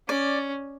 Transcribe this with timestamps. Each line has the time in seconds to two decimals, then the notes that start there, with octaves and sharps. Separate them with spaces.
0.08 C#4 D5